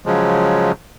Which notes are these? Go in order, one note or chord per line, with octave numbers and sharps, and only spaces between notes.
C#3 F3 F#3 G#3